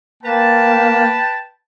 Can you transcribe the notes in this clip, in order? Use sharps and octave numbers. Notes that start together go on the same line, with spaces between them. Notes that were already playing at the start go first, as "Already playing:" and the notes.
A#3 B4 G5 A5